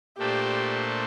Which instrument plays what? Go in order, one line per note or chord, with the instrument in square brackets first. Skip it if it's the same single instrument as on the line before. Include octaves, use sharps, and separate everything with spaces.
[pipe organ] A#2 A3 D4 A4 C5 [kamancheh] G4